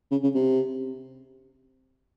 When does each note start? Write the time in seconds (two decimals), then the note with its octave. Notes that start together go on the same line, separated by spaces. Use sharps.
0.11 C#3
0.23 C#3
0.35 C3